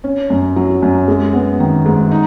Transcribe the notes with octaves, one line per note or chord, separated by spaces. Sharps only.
C#4
F#2
F#3
F#2
G#3
B3
D#3
G#2
D#4